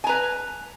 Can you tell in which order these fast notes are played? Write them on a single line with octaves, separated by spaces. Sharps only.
G#5 A#5 B4